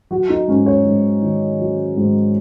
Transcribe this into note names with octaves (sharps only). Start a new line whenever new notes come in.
F#3 F#4
D#4
G#2 C#4
C#5
G#2
D#3
F#3
G#2